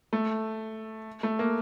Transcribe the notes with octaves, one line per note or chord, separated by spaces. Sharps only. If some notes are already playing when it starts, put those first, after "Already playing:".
A3
A3
A#3